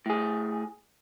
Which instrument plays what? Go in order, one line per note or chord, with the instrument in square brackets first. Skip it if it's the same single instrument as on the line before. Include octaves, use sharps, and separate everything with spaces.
[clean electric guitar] A2 G#4